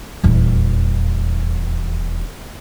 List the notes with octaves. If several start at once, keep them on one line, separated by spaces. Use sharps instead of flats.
D#1 E2